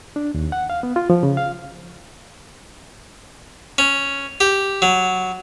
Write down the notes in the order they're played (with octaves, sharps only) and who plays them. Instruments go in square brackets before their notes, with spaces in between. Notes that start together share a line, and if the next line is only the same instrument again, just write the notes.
[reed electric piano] D4
D#2
F#5
F5
B3
F4
F3
C#3
F5
[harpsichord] C#4
G4
F#3